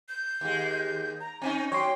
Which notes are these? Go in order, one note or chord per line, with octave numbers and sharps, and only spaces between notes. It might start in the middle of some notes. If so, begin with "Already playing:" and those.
G6
D#2 G#3
A#5
C4 C#4 D#4 G#5
F#3 C#5 G5 C6